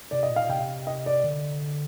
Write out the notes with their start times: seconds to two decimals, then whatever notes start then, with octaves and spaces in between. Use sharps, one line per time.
0.11 C3 D5
0.23 D#5
0.30 A#2
0.36 F5
0.49 C3 G5
0.87 D#5
1.06 D5
1.24 D3